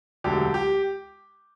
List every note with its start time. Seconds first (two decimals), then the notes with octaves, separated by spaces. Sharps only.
0.24 E1 D2 D3 F#3 G4
0.54 G4